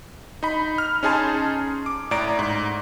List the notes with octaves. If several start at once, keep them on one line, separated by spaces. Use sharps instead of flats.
D#4 B5
F6
C#4 D#4 G#4 G#5 A5 C6
D6
A2 D5 A#5 D7
G#2